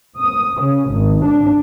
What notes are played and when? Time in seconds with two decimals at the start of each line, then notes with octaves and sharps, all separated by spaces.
0.17 D#6
0.63 C#3
0.91 G#1
1.25 D4